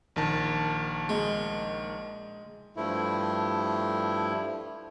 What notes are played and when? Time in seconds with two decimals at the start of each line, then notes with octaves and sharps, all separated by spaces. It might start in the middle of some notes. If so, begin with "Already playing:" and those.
0.16 A#1 D#3 A5
1.09 G#3
2.77 G2 F3 A3 E4